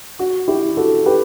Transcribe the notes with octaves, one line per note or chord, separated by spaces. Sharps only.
F#4
E4 G4
F#4 A4
G4 B4